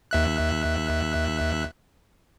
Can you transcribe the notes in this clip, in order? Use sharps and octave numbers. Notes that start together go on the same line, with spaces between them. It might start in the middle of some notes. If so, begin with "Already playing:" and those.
D#2 E5 F#6